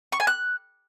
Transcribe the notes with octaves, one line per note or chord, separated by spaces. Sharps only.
C#6
G#5
F#6